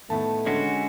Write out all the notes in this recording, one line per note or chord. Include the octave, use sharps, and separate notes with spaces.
A2 D#3 A3 B3 A5
D3 G#3 C#4 F#4